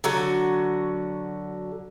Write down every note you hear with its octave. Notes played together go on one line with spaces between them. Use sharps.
D3 F#3 F#4